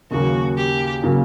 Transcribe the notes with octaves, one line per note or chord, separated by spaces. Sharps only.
D#2 C#3 F#3 A#3 F#4
G4
C#3 F#3 A#3